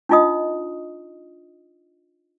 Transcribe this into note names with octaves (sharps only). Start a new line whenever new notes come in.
D4 D#4 F4 D#5 D#6